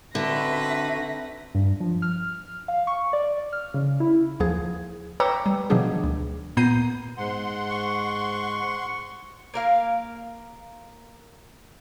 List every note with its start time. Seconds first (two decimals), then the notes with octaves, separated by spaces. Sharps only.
0.15 D3 C4 D#4 F#4 B4 E5 A#6
1.55 G2
1.80 F3
2.02 F6
2.68 F5
2.87 C#6
3.13 D5
3.53 F6
3.74 C#3
4.00 E4
4.40 D#2 F3 G#4
5.20 B4 C#5 G5 A#5 D6 E6
5.46 G3
5.70 B2 D#3 F3 F#3 D4 G#4
6.04 D2
6.57 A#2 B3 A#5 G6 C7 D#7
7.17 G#2 F#5 C6
7.70 C#6
9.54 A#3 A#4 F5